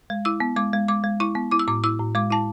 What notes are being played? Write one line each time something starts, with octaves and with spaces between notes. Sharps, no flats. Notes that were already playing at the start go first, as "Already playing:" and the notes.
G#3
E4 E6
B3
G#3 D6
G#3
G#3 D6
G#3
E4 C#6
B3
E4 D6
E6
A2 D6
E4 E6
A2
G#3 D6
E4 A5